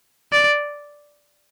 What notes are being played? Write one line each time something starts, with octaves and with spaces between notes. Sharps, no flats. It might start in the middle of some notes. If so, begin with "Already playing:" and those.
D5